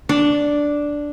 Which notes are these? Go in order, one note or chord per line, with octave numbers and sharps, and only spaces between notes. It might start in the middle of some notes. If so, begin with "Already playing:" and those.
D4